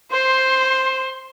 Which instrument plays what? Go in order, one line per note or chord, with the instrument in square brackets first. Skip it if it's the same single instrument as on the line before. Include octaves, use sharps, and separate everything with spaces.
[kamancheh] C5 [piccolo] C6